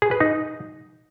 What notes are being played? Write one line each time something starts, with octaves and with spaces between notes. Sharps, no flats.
G#4
B4
D#4